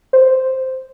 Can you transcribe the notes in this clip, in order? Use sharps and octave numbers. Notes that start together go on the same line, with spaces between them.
C5